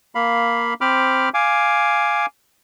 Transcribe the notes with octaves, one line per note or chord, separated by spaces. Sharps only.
A#3 F5 B5
C4 C5 B5 D6 F6
F5 G#5 D6